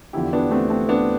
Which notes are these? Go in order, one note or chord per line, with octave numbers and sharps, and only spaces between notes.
E2 D3 F3 E4 G4
B3 D4
A3 C4
A3 C4
B3 D4